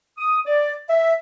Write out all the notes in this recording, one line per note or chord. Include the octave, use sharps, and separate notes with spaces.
D#6
D5
E5